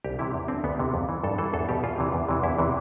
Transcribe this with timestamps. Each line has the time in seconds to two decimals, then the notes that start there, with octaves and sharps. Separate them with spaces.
0.04 C2 G4
0.19 C3 E3 E4
0.34 E2
0.48 D3 C4
0.64 D2 B3
0.79 C3 E3
0.94 F2
1.09 E3
1.24 G2 A4
1.38 E3 A4
1.54 E2 A4
1.69 B2 G4
1.84 E2 F4
1.98 C3 E3
2.13 E2
2.29 C3 E3
2.43 E2 E4
2.59 C3 E3